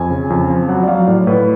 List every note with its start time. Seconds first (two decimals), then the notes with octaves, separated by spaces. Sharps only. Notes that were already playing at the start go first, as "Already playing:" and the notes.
Already playing: F2 G#5
0.10 C#3
0.30 F2
0.50 F3
0.68 F#3 F#5
0.83 D5
0.88 F#3 F5
1.07 A2 D5
1.27 A2 B4